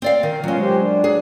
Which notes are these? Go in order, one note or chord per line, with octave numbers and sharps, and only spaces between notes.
C4 D5 F5
D#3
B2 F#3 G#3 C#4 F4
G4 C5
D4
G#4